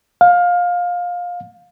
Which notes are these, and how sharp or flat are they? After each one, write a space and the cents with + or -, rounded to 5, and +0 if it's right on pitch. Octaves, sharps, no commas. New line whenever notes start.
F5 +20